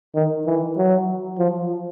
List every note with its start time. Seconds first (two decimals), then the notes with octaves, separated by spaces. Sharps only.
0.15 D#3
0.46 E3
0.77 F#3
1.38 F3